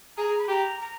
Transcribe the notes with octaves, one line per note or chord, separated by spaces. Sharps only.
G#4 A#5
A#5
B5
G4 A#5
A#5